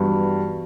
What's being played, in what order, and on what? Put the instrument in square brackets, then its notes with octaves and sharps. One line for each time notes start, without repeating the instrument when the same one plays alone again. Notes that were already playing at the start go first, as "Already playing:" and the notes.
Already playing: [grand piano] G2 [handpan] E3 B3 F#4 B4